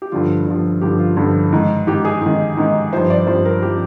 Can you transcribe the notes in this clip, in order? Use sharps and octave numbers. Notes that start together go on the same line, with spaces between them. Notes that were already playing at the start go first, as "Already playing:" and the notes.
G4
G2 D3 F3 F4
G2 D3 F3
G2 D3 F3 G4
F4
G2 D3 F3
G#2 D#3
G#2 D#3 G4
G#4
G#2 D#3
G#2 D#3
G2 F3 C5
D5
G2 F3 C5
A#4
F3 G4